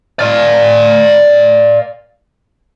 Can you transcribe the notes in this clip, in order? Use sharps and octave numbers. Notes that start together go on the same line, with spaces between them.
D5 F5